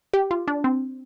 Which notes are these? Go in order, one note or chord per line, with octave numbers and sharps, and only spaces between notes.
G4
F4
D4
C4